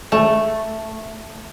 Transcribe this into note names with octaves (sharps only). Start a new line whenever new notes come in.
A3